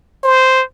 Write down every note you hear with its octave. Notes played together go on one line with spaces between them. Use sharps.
C5